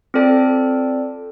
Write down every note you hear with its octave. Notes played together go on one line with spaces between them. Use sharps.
C4 F4 A4 D5 G5